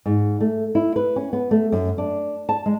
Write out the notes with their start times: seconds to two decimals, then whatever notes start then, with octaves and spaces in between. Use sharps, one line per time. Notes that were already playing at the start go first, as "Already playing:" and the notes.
0.06 G#2
0.40 A3
0.75 E4
0.96 B4
1.16 C#4
1.33 B3
1.51 A3
1.72 F#2
1.98 D4
2.49 A5
2.66 G#3